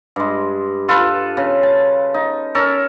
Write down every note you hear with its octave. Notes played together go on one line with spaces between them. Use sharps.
G2 G#3
F4 A4 B4
C#3
A5
D#4
C#4 A4 A#4